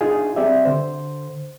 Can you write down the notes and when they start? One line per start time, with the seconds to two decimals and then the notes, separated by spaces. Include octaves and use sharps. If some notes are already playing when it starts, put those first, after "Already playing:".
0.01 D4 D#4 F4 G#4
0.36 C4 G4 D5 E5
0.65 D3 C5